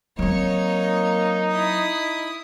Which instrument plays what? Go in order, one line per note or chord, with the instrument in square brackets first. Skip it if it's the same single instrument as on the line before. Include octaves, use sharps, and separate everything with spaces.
[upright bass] F#3 C4 [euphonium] A#3 [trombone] D#4 [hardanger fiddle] C#5
[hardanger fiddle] E4 D#6